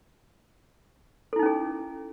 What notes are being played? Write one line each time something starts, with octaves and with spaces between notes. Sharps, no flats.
C#4 D#4 E4 G#4 A4